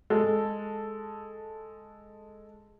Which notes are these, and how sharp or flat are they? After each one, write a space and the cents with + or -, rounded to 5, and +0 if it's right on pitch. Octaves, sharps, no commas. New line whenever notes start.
G#3 +0 A4 +0